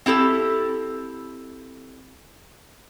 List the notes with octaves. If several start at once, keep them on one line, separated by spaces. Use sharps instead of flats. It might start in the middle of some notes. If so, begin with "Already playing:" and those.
C4 E4 G4 A4